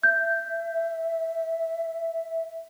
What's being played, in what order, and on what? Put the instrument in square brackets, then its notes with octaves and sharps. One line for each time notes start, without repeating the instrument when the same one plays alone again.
[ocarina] E5 [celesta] G6